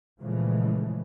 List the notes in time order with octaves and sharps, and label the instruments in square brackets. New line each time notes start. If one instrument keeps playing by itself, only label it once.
[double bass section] A#2 C#3 E3 F3 G#3 A3